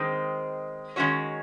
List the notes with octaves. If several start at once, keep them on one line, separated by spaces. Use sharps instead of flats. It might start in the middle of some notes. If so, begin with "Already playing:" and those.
Already playing: D#3 G#3 C4
D#3 G#3 C#4 F#4 C#5